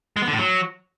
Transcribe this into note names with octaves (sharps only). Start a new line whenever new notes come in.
G#3
B3
D3
A2
F#3